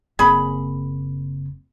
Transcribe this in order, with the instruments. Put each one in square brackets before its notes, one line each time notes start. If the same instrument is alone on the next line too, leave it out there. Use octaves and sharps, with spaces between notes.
[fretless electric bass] F#1 A#3 C4 [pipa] G#4 B5